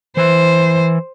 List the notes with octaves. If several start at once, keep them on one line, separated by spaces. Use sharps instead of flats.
E3 C5